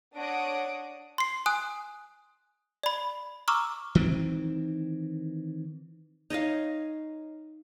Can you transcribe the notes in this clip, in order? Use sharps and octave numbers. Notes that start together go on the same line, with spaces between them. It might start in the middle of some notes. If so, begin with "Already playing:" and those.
D4 C#5 F#5 D#6 A#6 D7
C6 C7
G#5 D#6 F#6
D5 B5
A#5 C#6 D6 E6 F6
D#3 E3 C4
D#4 C#5 D#5 F5